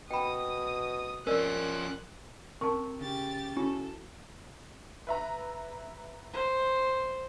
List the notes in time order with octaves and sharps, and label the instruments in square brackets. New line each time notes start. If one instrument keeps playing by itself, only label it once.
[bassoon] B2 [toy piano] G5 B5 [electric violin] D#6
[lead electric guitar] F3 C#4 [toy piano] A#4 D5 [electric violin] F#6
[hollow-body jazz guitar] C3 [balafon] A#4 A5 [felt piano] C#6
[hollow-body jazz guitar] C#3 [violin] G4 A6
[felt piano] C#4 [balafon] E4 F#4 [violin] A4
[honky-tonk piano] B4 E5 A#5
[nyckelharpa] C5